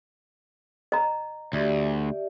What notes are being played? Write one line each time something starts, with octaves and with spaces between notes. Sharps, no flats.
D#5 A#5
D2 G4 D5 E5